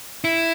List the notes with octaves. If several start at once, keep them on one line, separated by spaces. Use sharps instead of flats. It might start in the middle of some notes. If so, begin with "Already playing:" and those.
E4